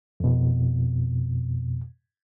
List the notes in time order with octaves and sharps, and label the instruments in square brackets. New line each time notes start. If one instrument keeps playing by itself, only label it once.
[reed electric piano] F2 B2